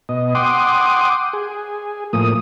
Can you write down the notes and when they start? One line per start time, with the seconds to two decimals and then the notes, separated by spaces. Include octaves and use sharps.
0.09 B2 D#5
0.35 F#5 G5 C6 D6 D#6
1.33 G#4
2.13 A2 F3 A#3 D#6